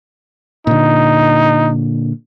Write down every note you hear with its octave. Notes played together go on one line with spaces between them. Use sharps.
A#2 D3 D#4